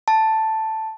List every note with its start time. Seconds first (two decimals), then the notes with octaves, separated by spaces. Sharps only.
0.08 A5